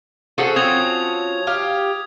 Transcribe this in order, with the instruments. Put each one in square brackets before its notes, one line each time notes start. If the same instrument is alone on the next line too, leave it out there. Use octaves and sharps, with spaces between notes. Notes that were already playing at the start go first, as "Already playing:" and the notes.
[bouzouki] F3 C#4 F#4 [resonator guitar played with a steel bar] G#4 A4 F#5
[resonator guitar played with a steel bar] C4 [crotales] D#6 G#6 F7
[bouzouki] G4 F5